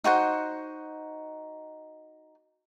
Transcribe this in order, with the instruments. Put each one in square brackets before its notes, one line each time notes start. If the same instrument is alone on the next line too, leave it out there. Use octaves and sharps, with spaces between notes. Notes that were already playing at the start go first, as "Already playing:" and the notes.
[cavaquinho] D#4 F#4 C5 F#5